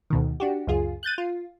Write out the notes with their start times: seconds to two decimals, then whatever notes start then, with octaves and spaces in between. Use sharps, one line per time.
0.10 D2 B2 D#3
0.40 D4 F#4 G4
0.67 C#2 F#2 F4 G#4
1.03 F#6 G6 A6 D#7
1.18 F4